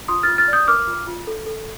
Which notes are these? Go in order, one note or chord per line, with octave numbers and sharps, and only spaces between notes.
F4 C6 D#6
F6 A6
F4
F6 A6
D5
D#6 G6
A#4 D6 F6
F4
F4
A4
A4